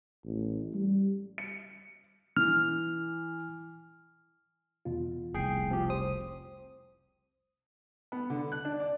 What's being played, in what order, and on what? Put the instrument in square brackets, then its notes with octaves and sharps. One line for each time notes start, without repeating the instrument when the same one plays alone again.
[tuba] A1
G3
[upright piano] C#7
[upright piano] E3 [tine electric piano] F6
[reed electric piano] E2 B2 F4
[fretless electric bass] F1 C2 [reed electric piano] B2 [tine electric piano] G#4 G5 C7
[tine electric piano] F3 G4 [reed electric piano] C4
[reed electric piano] C5 [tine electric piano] D#6
[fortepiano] B3
D3
F#6
D4
D5